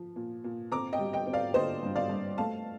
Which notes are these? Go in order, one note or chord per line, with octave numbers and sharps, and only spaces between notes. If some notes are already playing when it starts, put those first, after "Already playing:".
Already playing: F3
A#2
A#2
C4 A#5 D6
D#5 G5
G3
D#5 G5
C4
D5 F5
D3 C5 D#5
G2
D5 F5
G2
A3 F5 A5